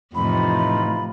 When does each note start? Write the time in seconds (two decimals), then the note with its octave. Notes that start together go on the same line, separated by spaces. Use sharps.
0.15 F2 A2 C3 E3 D#4 F4 B5